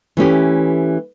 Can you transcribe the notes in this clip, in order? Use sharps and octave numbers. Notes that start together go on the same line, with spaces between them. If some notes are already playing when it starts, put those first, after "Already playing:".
E3 A3 C#4 G4